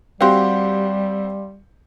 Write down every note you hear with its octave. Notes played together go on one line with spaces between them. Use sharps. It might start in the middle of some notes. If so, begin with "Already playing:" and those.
G3 C4 F#4 G4 F5 C6